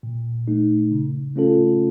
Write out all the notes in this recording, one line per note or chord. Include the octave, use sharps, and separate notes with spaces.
A#2
A3 D#4
C#3
A3 C#4 F4 A4